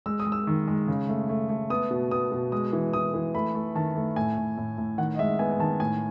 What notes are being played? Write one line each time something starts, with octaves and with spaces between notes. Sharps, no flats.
G#3 E6
D#6
G#3
E6
D#3
G#3
C#3
A3
A3
A3
B3 D#6
B2
B3 D#6
B2
G#3 D#6
E3
E3 D#6
E3
A3 B5
A3
D#3 A5
A3
A2 G#5
A2
A2
A2
D#3 F#5
D#5
G#3 E5
B3 G#5
G#5
D#3 A5
A2 G#5